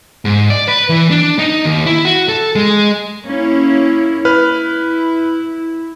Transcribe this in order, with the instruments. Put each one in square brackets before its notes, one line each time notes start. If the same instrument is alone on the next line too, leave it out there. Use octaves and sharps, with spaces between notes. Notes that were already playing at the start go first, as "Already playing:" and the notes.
[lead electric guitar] G#2
D5
B4
E3
D4
D#4
D#2
E4
F#4
A4
G#3
[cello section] A#3 C#4 E4
[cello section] E4 [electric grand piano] B4 F6